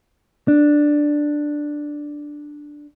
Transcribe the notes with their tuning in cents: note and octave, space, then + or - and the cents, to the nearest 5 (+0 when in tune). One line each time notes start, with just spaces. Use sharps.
D4 +5